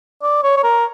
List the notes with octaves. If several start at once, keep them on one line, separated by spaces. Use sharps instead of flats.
D5
C#5
C#5
A#4